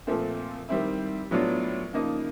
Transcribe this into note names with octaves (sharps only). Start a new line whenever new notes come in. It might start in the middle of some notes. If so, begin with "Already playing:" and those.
A#2 F3 A3 C4
D#3 G3 C4 E4
A2 F#3 B3 D4 F4
C#3 F3 A#3 D#4